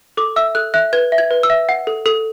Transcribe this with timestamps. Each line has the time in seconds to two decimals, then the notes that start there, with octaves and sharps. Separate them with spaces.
0.17 A4 D6
0.36 E5 E6
0.55 A4 F#6
0.74 E5 F#6
0.93 B4 G#6
1.12 E5
1.18 G#6
1.31 B4
1.43 E6
1.50 E5
1.69 F#5
1.87 A4
2.06 A4